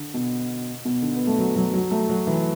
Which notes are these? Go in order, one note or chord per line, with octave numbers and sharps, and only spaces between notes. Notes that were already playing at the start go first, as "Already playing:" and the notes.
Already playing: D3
B2
B2
D3
B3
A3
F#3
F#3
F#3
A3
F#3
E3